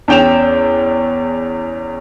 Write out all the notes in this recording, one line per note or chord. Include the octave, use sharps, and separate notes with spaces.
E2 C#4 G5 E7 F7